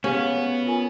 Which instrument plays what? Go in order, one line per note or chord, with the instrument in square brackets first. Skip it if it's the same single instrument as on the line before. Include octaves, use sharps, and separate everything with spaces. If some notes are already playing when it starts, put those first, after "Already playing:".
[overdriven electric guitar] B3 [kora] C#4 [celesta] G4 G#4 F5
[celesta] F4 A#4 G#5